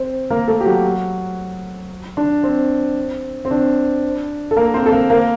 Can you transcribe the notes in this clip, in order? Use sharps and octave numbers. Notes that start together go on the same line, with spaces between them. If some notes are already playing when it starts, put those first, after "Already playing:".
Already playing: C4 C5
A#3 A#4
A3 A4
G4
F#3 F#4
D4
C4
C4
D4
A4
A#3 A#4
C4 C5
A4
A#3 A#4
A#3 A#4